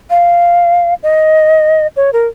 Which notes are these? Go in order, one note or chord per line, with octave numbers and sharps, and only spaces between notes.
F5
D#5
C#5
A#4